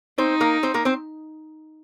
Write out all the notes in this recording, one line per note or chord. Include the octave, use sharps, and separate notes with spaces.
C4 D#4 C5
A#3 A#4
C4 C5
A#3 A#4
C4 C5